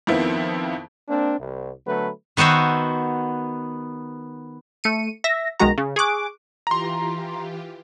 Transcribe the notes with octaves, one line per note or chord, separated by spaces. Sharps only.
F2 D#3 F3 B3 C4 E4
A#3 C4 D4
C2
D3 F#3 A3 B3 B4
D#3 B3 F#4 C5 E5
A3 C#7 D#7
E5 A#6
B1 D#3 G#3 F#4 A#5
C#3
G#4 C#6 D6 F#6
E3 F4 G4 A#5 C6